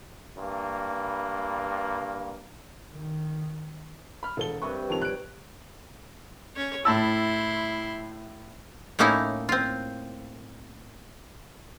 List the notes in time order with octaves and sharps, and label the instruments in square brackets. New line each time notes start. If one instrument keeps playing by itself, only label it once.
[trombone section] G2 E3 A#3
[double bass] D#3
[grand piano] B5 F6
E1 A4 G7
[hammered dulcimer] G2 C3 B4 [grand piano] C#6
[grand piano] F2 D#3 F7 [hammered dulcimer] C#5 G5
[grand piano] F#6 D7
[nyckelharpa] C#4 C#5
[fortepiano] A2 A5 E6 [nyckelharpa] E4 C6
[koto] A2 A3 A#3 C#4 D#4 E4
C4 F4